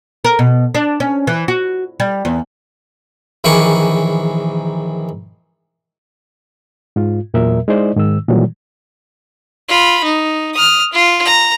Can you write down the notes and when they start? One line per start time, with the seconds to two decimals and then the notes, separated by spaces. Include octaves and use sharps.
0.25 A#4
0.39 B2
0.75 D4
1.00 C#4
1.27 E3
1.48 F#4
2.00 G3
2.25 E2
3.44 A#1 D#3 E3 G#4 C#6 D6
6.96 G#2 F4
7.34 E2 A#2 F#3 A#4 E5
7.68 G#3 D#4 E4 C5 D5 D#5
7.96 G#2 D#3 E6
8.29 A#2 D#3 E3 F#3 G3
9.69 F4 B5
10.04 D#4
10.54 D#6 F6
10.93 F4
11.25 A#5